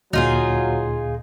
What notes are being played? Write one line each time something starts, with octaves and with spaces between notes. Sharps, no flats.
D2 A#2 F#3 D#4 F4 G#4